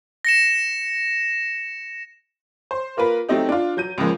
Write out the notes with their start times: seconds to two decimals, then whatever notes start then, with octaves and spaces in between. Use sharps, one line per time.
0.25 A#6 C#7 E7
2.71 C5
2.97 A#3 F4 A#4 B4
3.29 F#3 A3 C4 D#4 G4
3.49 D4 F4
3.77 F#3 G6 D#7
3.98 C#2 C#3 F3 G#3 A#3